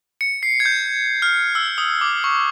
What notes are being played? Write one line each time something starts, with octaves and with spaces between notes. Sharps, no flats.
C#7
C7
G#6
G6
F6
E6
D#6
D6
C#6